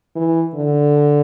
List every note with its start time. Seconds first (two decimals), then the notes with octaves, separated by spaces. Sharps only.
0.16 E3
0.55 D3